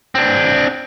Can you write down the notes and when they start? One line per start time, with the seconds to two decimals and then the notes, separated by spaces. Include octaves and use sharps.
0.15 C4 D4